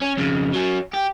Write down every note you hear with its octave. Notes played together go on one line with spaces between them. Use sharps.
C#4
F2 C#3
F#3 C#4
G4